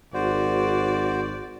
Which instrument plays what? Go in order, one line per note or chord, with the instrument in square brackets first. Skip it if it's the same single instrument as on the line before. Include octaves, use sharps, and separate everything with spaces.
[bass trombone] G#1 [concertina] F#4 C5 [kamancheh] D5